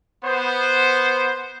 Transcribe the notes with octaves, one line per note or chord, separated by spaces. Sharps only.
B3 C5